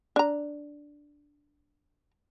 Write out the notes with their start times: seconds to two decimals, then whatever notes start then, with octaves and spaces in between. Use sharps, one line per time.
0.16 D4 A#5